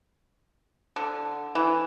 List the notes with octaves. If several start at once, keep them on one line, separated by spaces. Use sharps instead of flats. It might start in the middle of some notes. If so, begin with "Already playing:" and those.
D3
E3